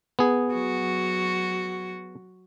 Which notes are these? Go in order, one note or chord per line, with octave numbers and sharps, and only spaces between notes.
B3 G#4
F#3 F#4